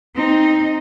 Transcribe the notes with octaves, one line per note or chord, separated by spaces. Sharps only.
C4 D#4